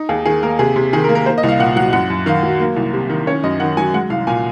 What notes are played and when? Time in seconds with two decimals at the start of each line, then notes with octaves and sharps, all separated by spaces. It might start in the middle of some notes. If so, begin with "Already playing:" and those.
Already playing: D#4
0.09 D#2 G#4
0.25 D#3 G#4
0.42 A#3 A#4
0.59 C3 G#4
0.76 C3
0.93 D#3 G#4
1.04 A#4
1.09 A#3
1.15 A#4
1.26 A#3 C5
1.38 D#5
1.43 C2
1.49 F5
1.59 A#2 F#5
1.76 F#3 F#5
1.93 F#2 F#5
2.10 F#2
2.26 D#3 F5
2.43 F#3
2.60 A#3
2.76 C2
2.93 C3
3.10 D#3
3.27 C#4 C#5
3.44 F#2 D#5
3.60 D#3 F#5
3.77 F#3 G#5
3.93 G#3 F#5
4.10 C2 F5
4.27 A#2 G#5